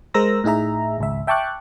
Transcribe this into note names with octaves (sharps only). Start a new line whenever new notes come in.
G#3 A#4 C5 E6 A#6
A2 D#4 G#4 E5 A#5
G#1 C#2 E5
E5 G5 A5 C#6 D6 F#6